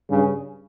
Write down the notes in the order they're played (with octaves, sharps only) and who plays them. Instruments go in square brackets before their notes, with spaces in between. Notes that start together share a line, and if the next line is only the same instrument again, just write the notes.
[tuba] G2 [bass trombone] C#3